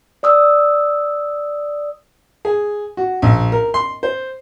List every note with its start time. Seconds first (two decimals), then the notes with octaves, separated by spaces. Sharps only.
0.23 D5 D#6 E6
2.45 G#4
2.97 F#4
3.22 A#1
3.52 A#4
3.74 C6
4.03 C5